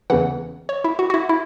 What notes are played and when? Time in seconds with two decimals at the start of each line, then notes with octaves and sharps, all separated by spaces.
0.10 E2 C#3 E3 F#5
0.69 C#5
0.84 E4
0.99 F#4
1.10 F#4
1.14 E4
1.29 E4